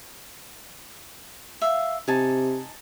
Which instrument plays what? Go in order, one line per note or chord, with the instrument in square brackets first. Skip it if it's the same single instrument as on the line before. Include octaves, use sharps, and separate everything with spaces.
[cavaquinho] E5 F5
[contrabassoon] C3 [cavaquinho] D#4 G#5 A5